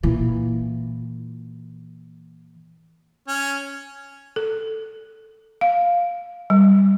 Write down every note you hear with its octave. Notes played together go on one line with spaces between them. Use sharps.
A#2 E3
C#4
A4
F5
G3